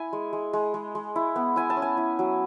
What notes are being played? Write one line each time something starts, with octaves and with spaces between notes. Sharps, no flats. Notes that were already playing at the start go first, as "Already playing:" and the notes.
Already playing: E4 G#5
G#3
G#3
G#3
G#3
G#3
E4
B3
E4 G#5
A5
C#4
G#5
E4
F#3